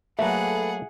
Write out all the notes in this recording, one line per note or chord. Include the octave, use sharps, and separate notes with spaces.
F#3 A3 A#3 G#4 A4 B4 E5 F#5